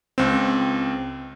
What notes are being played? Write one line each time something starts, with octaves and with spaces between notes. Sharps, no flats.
C#2 C4